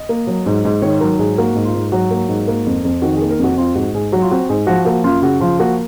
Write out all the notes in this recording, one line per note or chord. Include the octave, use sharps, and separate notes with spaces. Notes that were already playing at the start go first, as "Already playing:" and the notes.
Already playing: D#5
A#3
F#3
G#2
G#2
D#3 C#5
F#3 A#4
G#2 G#4
A#3 F#4
G#2
F4
G#2
F#3 F#4
A#3
G#2
A#3
F2
F2
D#3 F#4
G#4
A#3
A#4
F2 F#4
C4 F4
G#2 F#4
G#2 G#4
F#3 F#4
F4
C4 F#4
G#2 G#4
F3 F#4
A#3 F#4
F#2 F4
C#3 F#4
F3 F4
A#3 F#4